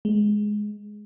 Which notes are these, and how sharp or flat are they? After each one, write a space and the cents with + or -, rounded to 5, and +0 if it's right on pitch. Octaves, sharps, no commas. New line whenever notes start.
G#3 +10